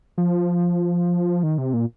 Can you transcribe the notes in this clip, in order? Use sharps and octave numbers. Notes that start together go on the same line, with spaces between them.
F3
D#3
C3
A#2